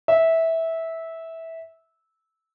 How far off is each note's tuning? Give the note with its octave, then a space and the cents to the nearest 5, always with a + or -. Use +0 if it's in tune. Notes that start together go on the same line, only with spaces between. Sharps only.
E5 -15